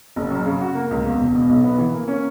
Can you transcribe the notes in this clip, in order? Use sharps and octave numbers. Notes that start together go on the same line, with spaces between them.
F#1
F#2
C#3
F#4
A#3
C#2
E2
E1
B2
B1
B3
E3
A#3
C#4